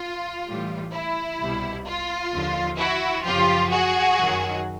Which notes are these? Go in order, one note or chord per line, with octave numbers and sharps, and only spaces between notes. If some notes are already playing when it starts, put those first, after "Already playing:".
Already playing: F4
A2 E3 G3
E4
C2 B2 G3
F4
D#2 D3 F3
E4 F#4
F#2 C#3 F3 F4 G4
F#4 G#4
F#2 D#3 F#3